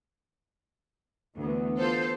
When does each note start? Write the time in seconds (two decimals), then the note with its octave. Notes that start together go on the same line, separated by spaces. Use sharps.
1.37 D2 E3 B3
1.78 F4 A4 C5